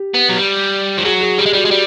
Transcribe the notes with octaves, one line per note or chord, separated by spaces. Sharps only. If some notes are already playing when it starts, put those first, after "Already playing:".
Already playing: G4
B3
F#3
G3
F3
F#3 G#4
G#4
G3 G4
G#3
G3 F#4
G#3
G3